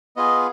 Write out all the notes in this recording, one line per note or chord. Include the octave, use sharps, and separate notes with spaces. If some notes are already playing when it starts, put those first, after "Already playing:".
B3 F4 G#4 D#5